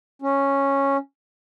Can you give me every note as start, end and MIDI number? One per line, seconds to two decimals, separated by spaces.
0.22 0.97 61